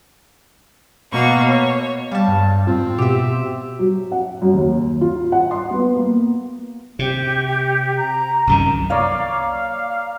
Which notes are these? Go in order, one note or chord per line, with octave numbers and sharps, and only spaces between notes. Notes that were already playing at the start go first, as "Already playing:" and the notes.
B2 A#3 C#6
C#5
G3 F5 A5
G2
G#2 C4 F4
B2 F#4 G4 E5
F#3
F#5
F#2
D#2
F4
F#5
C6
B3
A#3
C3 G4
A#5
C2 F#2 D#3
A#3 C#5 D5 F5